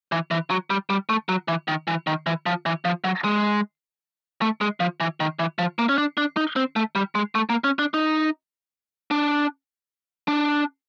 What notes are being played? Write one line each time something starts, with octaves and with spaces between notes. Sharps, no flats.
E3
E3
F#3
G3
G3
A3
F#3
E3
D#3
E3
D#3
E3
F3
E3
F3
F#3
G#3
A3
G#3
F3
E3
D#3
E3
F3
A#3
C#4
D4
D4
D#4
C4
A3
G3
G#3
A3
A#3
C#4
D4
D#4
D4
D4